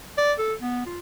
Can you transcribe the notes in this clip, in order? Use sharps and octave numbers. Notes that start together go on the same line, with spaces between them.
D5
A4
B3
F4